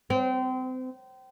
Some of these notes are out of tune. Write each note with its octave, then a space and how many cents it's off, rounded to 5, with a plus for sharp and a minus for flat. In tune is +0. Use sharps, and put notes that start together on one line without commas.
C4 -30